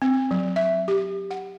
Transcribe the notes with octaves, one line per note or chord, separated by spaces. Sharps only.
C4
F#3
E5
G4
F#5